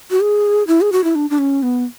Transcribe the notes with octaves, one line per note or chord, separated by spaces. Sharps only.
F#4
G#4
E4
G#4
F#4
E4
D4
D4
C#4
B3